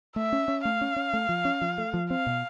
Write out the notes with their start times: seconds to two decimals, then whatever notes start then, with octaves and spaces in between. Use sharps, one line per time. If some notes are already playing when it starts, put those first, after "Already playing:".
0.16 A3 E5
0.33 C#4
0.48 C#4
0.65 A3 F5
0.81 C#4
0.96 C#4
1.13 A3
1.29 F3
1.45 C#4
1.61 F3
1.78 A3
1.94 F3
2.10 C4 F5
2.27 B2